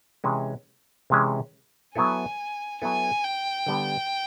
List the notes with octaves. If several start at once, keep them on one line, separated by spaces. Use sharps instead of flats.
C3 E3 G#3 C#4
C3 E3 G#3 C#4
F#3 B3 E4 A4 G#5
F#3 B3 E4 A4 G#5
G5
D3 G3 B3